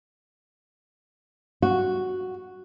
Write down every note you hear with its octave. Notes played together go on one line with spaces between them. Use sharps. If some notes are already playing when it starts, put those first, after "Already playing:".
F#4